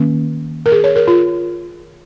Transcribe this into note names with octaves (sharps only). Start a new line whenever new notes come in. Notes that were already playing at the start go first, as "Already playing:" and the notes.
Already playing: D#3 A#3 C#4
A#4
G#4
C#5
A#4
F4